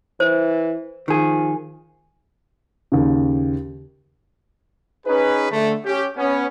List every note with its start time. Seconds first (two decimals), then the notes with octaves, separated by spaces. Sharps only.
0.20 E3 C5
1.08 D#3 F3 G#4
2.92 D#2 C#3
5.07 C#4 D#4 G#4 B4
5.51 D3 A3
5.86 C#4 G4
6.17 B3 C#4